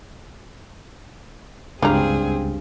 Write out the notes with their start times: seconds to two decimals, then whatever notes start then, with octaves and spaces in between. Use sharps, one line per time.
1.82 C#2 G2 C4 D4 G4 G#4 F5 A#5